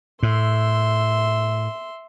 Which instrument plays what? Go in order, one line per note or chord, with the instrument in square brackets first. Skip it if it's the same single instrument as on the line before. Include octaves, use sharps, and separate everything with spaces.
[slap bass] A2 [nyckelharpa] E5 C6